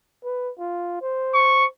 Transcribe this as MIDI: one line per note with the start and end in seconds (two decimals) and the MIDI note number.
0.24 0.51 71
0.59 0.99 65
1.02 1.68 72
1.34 1.65 85